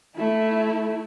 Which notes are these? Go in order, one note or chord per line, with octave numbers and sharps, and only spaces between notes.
A3 E4